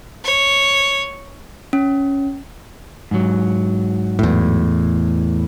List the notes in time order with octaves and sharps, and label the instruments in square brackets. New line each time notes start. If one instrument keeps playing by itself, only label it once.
[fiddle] C#5
[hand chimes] C#4
[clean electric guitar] G#2 F#3
[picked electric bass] E2 A2